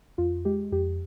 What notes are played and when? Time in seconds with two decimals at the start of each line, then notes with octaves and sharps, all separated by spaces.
0.18 F2 F4
0.45 G#3 G4
0.72 F2 G4